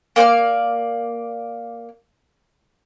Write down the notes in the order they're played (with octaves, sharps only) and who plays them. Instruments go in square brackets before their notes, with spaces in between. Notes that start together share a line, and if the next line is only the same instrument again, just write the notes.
[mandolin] A#3 D5 F#5 F6